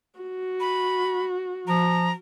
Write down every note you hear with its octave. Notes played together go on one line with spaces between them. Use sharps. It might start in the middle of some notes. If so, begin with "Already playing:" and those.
F#4
B5
F3 A#5